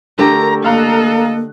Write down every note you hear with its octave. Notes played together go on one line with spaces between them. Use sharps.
D3 A3 G4 A#4 A#5
A#3 A4 D#5 F5 A#5 F#6